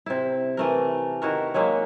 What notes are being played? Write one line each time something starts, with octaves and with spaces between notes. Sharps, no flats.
C3 E4
E3 A3 A#4
D#3 E4 F#4 A#4
F#3 G#3 A#3 E4